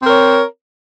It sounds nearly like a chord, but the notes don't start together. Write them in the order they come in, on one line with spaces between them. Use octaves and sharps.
C4 A#4 C#5